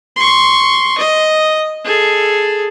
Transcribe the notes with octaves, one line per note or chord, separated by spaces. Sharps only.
C6 C#6
D#5
G#4 A4